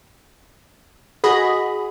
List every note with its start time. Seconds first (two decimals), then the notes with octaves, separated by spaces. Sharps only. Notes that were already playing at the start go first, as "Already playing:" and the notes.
1.24 F#4 G#4 D#5 B5